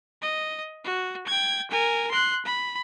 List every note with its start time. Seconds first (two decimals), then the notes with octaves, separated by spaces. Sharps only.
0.22 D#5
0.85 F#4
1.27 G5 G#6
1.71 A#4 G#5
2.11 C6 F#6
2.45 B5